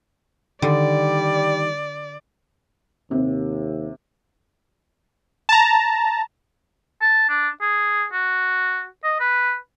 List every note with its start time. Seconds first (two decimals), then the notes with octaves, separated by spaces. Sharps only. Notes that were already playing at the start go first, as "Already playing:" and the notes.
0.62 D3 D#3 G3 D5
3.11 D#2 C3
5.49 A5 A#5
7.01 A5
7.29 D4
7.61 G#4
8.13 F#4
9.04 D#5
9.20 B4